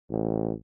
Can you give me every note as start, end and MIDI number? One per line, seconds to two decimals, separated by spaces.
0.10 0.53 33